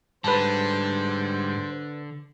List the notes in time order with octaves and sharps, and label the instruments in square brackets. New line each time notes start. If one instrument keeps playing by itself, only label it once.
[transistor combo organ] G#2 G3 [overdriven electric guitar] D3 [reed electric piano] B4 A5 [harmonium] C5